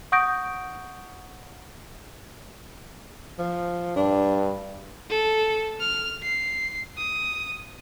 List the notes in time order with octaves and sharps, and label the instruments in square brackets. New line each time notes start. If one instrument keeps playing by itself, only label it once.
[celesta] F#5 C#6 D#6 G6 A#6 D7
[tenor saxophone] F3
[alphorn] G2 [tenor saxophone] D4
[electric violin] A4
F6
C7
D#6